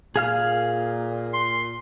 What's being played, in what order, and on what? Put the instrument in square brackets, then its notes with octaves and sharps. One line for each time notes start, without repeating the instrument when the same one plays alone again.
[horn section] A#2 [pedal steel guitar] G#4 F5 F6
[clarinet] C6